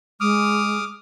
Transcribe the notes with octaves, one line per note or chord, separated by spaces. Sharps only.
G#3 D6 D#6 F6